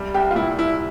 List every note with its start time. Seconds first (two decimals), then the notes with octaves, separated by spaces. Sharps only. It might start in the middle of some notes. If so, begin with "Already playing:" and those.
Already playing: C2 G3
0.14 C2 G4
0.31 F4
0.36 A#2 E4
0.58 C2 E4